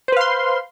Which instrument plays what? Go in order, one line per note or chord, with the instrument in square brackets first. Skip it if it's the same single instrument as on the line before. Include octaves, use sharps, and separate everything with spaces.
[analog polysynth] C5
B4
F5
C6